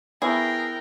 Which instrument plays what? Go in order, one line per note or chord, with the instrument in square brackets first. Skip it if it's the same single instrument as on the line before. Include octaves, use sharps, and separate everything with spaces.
[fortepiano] B3 C#5 [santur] E4 A#5 [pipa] G#4 [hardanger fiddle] A#4 G5